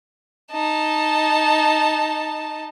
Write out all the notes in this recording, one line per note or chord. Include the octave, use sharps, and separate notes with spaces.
D#4 A5